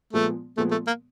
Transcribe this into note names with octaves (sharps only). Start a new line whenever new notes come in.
A#2 F3 G#3 A3 B3
A#2 F3 G#3 A3 B3
A3
A#3